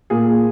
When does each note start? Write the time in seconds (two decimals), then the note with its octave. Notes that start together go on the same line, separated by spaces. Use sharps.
0.10 A#2 G#4